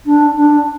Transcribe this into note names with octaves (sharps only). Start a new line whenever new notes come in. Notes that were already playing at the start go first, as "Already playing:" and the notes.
D4
D4